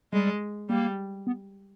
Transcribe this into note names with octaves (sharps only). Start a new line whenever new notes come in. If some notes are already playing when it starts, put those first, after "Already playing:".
G3 G#3
G3 A#3
B3